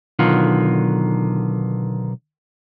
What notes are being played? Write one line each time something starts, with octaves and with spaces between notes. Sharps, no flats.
B1 D3 D#3 F4 F#5